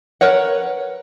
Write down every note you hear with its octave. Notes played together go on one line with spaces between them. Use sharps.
A#4 B4 C#5 F#5